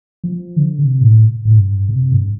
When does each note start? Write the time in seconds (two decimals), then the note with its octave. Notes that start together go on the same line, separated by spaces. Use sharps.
0.24 F3
0.56 D3
0.79 C3
1.01 A2
1.45 A2
1.57 G2
1.89 C3
2.12 G2